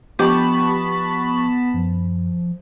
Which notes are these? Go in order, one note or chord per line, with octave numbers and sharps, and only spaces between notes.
F3 B3 G4 D#5 A5 B5 C#6
F#2 F3